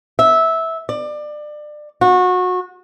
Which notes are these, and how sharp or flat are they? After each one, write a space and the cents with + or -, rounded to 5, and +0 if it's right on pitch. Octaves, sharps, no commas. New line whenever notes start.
E5 -15
D5 +25
F#4 -25